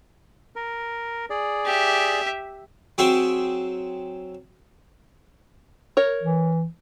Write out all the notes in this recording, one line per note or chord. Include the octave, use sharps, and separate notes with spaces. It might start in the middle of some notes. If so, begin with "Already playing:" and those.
A#4
G#4 D5
G4 E5
F#3 C4 G#4 E5 G5 C6
A#4 C#5
E3